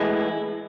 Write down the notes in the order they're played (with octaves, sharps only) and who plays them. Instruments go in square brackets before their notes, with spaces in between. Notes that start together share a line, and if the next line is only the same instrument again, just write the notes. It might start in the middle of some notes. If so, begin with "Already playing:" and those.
Already playing: [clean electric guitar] A2 E3 G#3 E4